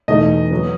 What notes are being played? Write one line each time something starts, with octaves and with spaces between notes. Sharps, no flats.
E2 B2 A3 D#4 D#5
F#3 B3